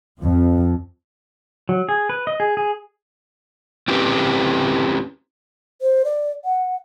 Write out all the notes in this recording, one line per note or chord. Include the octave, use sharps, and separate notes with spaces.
F2
F#3
G#4
B4
D#5
G#4
G#4
C4 C#4 E4 G4 B4
C5
D5
F#5